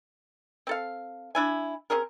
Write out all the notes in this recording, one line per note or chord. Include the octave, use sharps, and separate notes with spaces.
C4 A4 F5
D4 E4 G#5
C4 C#4 G#4 A#4